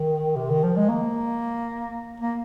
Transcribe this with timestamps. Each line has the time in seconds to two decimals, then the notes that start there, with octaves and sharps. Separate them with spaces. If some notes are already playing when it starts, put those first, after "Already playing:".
Already playing: D#3
0.36 C3
0.50 D#3
0.63 F3
0.76 G#3
0.89 A#3
2.20 A#3